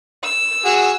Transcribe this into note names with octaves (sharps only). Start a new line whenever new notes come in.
E6
F#4 G#4